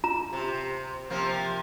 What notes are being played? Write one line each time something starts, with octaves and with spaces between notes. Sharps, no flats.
F4 A#5
C3
C3 F3 A#3